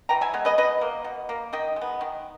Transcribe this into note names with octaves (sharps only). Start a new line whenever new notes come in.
E3 G5 A#5
E5 G#5
G#3 B3
B4 D#5
B2 B4 D#5
A#3
B2
A#3
D#3 D#5 G5
G#3
B3
D#3